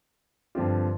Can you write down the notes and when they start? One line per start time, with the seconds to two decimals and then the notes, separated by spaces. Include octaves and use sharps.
0.55 G2 D3 F3 C4 F4